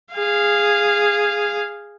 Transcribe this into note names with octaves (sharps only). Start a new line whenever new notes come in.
G#4 F5